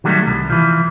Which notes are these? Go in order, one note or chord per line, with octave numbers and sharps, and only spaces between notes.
D#3 F#3 G3 A3
C2
E3 F3